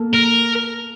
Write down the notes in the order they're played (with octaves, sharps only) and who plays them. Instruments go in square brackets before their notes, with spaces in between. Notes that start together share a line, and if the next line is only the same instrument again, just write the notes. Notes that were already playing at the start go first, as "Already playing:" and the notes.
Already playing: [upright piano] A#3 A4
[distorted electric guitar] A#4